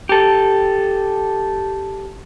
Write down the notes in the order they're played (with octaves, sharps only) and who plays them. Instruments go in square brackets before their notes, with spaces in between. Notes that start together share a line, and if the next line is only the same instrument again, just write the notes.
[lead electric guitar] G4 A4